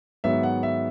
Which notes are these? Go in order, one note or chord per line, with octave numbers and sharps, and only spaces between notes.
G#2 D#3 F#3 B3 E5
F#5
E5